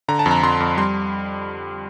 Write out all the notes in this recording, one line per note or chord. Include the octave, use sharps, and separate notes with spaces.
D3 A#5
A5
F2
A#5
F2 C6
F2
G3 C6